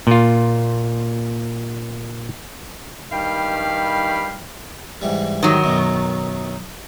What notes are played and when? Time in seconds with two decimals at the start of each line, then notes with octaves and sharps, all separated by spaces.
0.07 A#2 F4
3.11 G2 D#3 F5 G5 B5
5.02 G#2 E3 G3
5.43 D#3 F#3
5.64 F#2 B2